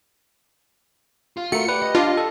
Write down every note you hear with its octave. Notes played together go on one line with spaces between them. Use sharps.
F4 F5
A3 F#4 A#4 C#7
G4 B4 D5
D#5
D4 F4 D5
A4